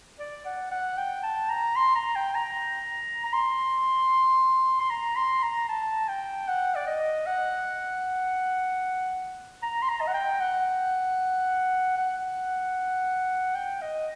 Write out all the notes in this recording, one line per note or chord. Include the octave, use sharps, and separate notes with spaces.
D5
F#5
F#5
G5
A5
A#5
C6
A#5
G5
A#5
A#5
C6
C6
A#5
C6
A#5
A5
G5
F#5
D5
D#5
F#5
A#5
C6
A#5
D#5
F#5
G5
F#5
F#5
G5
D#5